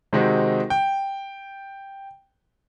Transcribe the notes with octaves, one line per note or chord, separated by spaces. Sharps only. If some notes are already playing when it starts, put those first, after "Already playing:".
C3 D#3 G#3 C4 D#4 F#4
G5